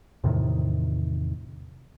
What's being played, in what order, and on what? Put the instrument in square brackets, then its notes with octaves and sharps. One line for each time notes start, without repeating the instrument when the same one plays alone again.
[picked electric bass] E2 A2 C3 D#3